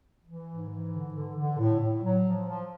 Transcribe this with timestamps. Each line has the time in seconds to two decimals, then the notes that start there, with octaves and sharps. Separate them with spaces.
0.25 E3
0.46 G#2
0.68 E3
0.91 D3
1.14 D3
1.35 D3
1.58 A2
1.79 A2
2.02 F#3
2.24 F3
2.46 F3